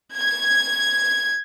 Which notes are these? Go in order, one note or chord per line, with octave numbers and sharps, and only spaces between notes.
G#6